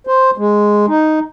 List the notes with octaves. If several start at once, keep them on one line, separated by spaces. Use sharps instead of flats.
C5
G#3
D#4